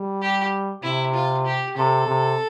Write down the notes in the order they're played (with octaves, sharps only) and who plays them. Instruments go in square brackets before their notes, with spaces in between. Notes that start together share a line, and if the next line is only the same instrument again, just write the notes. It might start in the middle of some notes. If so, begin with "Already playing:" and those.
Already playing: [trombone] G3
[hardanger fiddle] G4
[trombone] C3 [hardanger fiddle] E4
[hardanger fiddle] F4
G4
[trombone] C3 [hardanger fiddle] A4
[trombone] C3